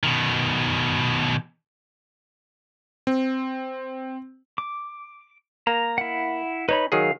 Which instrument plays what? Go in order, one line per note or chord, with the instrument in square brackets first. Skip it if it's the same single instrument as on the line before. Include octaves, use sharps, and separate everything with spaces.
[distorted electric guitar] B2 D#3
[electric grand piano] C4
[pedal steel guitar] D6
[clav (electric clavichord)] A#3 [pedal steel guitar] A#5
[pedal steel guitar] E4 F#5
[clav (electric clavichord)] D#4 [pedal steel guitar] B4 C#5 B5
[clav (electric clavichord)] D#3 F#3 G#4 [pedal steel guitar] F5